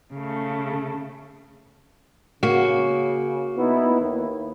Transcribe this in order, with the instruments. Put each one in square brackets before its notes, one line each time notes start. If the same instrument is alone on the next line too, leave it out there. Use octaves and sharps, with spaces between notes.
[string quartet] C#3 A3
[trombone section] C#3 [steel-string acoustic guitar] A#3 F#4
[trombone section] B3 D#4 E4
D#2